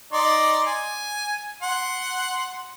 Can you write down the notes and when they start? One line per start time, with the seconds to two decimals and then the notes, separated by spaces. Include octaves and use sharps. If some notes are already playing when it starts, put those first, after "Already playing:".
0.13 D#4 D5 C6
0.66 G#5
1.62 F#5 C6